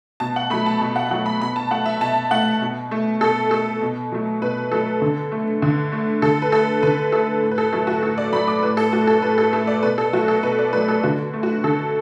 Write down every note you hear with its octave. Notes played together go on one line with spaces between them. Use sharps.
B2 A5
F#5
F#3 A3 B5
A5
B2 A5
F#5
F#3 A3 F#5
B5
B2 B5
A5
A3 F#5
E5
B2 A5
A3 F#5
B2
A3
B2 A4
A3 A4
B2
F#3 A3
B2 B4
F#3 A3 A4
D3
A3
D3
A3
D3 A4
B4
A3 A4
D3 B4
A3 A4
A2
B4
A4
F#3 A3 A4
F#4
A2 A4
D5
F#3 A3 B5
D6
A2 B4
A4
A3 F#4
A4
A2 B4
A4
A3 A4
D5
B2 B4
A4
F#3 A3 F#4
A4
B2 B4
D5
F#3 A3 B4
A4
D3 F#4
A3
F#4
D3 A4